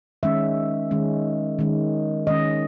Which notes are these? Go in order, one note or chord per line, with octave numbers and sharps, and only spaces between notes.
D#3 G#3 C#4 E5
D#3 G#3 C#4
D#3 G#3 C#4
D#3 G#3 C#4 D#5